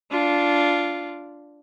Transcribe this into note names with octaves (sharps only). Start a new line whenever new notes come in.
D4 F4